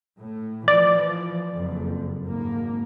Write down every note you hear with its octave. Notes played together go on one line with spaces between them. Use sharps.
A2
E3 F3 D5
F#1 F2
G#1 A#3